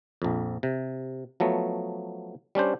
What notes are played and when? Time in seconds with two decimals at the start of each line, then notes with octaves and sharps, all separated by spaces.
0.22 A#1 F2
0.63 C3
1.40 F3 F#3 A3 B3
2.55 G3 C#4 D4 C5